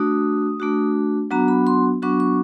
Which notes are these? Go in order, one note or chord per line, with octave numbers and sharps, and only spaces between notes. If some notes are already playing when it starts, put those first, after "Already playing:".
Already playing: A3 D4 F#4 D#6
A3 D4 F#4
F#3 B3 D4 F#4 A#5
B5
C6
F#3 B3 D4 F#4 C#6
C#6